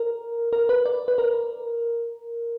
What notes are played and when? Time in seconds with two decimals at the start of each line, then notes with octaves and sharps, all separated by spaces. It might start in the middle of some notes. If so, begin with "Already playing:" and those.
Already playing: A#4
0.53 A#4
0.69 B4
0.86 D5
1.08 B4
1.18 A#4